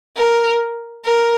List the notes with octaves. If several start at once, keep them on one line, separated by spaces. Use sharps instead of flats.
A#4
A#4